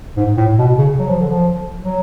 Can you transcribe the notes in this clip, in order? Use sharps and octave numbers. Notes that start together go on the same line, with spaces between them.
G#2
A2
B2
C#3
F#3
F3
D3
F3
F#3